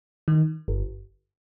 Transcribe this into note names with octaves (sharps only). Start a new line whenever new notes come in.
D#3
G1